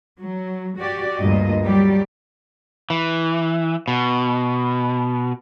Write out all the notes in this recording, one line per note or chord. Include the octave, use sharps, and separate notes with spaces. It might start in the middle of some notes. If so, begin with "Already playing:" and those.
F#3
F#4 G4 D5
D2 G2 A#2 G#3 D#5
F#3 G3 G4 D5
E3
B2